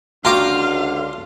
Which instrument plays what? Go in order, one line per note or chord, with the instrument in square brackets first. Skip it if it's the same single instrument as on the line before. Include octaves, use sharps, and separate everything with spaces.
[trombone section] C#2 D3 [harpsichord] F4 D6 [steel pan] F#4 G5 A#5 [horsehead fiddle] F5